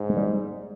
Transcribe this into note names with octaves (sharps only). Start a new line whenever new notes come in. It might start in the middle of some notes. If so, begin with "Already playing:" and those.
Already playing: G#2
G#3
G3